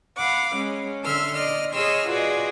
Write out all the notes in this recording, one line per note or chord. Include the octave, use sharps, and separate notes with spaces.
F5 F#5 B5 D6
G#3 C#4
D3 A4 E5 C6 F6
D5 D#5 F6
G#4 C#5 D#5 C6 E6 F6
F4 F#4 G#4 B4 D5 D#5